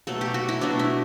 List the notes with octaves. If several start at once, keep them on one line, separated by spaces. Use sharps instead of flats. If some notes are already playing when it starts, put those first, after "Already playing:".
B2 F#3 A3 A4
G4
F#4
E4
B2 F#3 A3 D4
E4